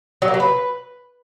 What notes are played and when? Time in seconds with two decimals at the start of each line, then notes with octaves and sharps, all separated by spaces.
0.22 F#3
0.28 A#3
0.34 F#3
0.40 B4